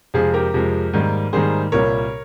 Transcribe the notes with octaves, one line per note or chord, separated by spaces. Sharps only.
F2 C3 F3 G#3 F4 G#4
G4 A#4
F2 C3 F3 G#3
G#2 D#3 G3 A#3
G#2 D#3 G3 A#3 G#4 C5
C2 A#2 G3 A#3 A#4 C#5